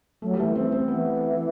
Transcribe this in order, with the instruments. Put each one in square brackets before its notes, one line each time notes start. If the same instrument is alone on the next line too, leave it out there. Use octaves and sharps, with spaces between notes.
[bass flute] F#3 [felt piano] A3
[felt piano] G3
[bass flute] E3 [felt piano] A3
[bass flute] E3 [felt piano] C4
[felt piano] C4
[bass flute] E3 [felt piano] B3